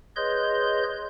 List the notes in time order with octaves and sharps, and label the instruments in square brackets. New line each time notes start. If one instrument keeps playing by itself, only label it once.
[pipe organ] G#4 B4 C#5 D#5 C6 G6